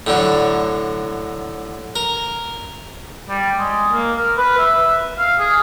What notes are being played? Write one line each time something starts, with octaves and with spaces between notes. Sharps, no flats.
A2 D3 F#3
A#4
G3
G#3
A#3
A#4
B4
E5
F5
G#4